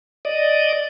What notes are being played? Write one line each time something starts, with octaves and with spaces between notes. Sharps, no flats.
D5 D#5